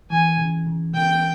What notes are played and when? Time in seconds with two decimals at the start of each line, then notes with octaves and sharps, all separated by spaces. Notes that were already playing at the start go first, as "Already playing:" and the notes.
0.10 E3 G#5
0.38 C#3
0.67 C#3
0.94 C#3 G5